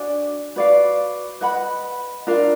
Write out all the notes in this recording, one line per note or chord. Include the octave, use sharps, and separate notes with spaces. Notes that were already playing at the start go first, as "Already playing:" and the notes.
Already playing: D4 F#4 D5 G#5
F#4 B4 D5 F5
B4 D#5 F#5 B5
D4 F4 A#4 F5